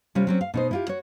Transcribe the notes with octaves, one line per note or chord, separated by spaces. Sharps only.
C3 G3 C#4 F4
F#3 C4 C#4
F5
B2 D#4 C5
E4 F4 G4
F#4 C#5